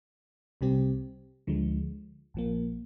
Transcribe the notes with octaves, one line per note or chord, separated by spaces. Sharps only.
C2 C3 G3 C4 G4
D2 D3 F3 G#3
A#1 A#2 F3 A#3